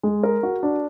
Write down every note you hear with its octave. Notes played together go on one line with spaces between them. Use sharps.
G#3
A#4
F#4
D4